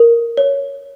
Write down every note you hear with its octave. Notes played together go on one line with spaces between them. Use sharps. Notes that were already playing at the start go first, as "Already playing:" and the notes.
Already playing: A#4
C#5